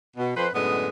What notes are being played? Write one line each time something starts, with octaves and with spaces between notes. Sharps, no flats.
B2
F2 B4 C5
F#2 A2 D3 G#3 B3 D#5